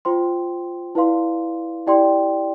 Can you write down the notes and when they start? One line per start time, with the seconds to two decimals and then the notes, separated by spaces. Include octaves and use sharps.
0.05 F4 C5 G5 C6
0.95 E4 B4 D5 F5 C6
1.87 E4 G4 D5 G5 C6